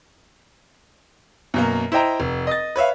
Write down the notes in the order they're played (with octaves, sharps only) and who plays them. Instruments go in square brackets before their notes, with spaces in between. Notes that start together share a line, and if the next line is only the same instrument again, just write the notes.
[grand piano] F#2 B2 A#3
E4 C5 D#5 G5 A#5
F1
D#5 D#6 A6
B4 C#5 E5 F5